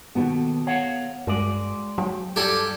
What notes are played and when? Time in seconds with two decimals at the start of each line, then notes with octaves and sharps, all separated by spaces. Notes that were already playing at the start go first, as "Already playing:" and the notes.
0.15 D#2 G#2 B2 B3 F#4 A4
0.67 C#5 F5 F#5
1.27 G2 G#3 F#4 D5
1.98 F#3 G5
2.36 G2 G3 G4 A4 D5 G#5